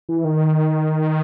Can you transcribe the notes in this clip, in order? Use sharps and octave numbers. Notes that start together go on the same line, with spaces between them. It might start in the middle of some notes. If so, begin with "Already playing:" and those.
E3
D#3